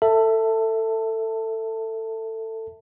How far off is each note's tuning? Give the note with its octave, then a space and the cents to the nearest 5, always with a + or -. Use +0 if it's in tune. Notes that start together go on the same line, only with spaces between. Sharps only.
A4 +20 E5 +0 A5 +15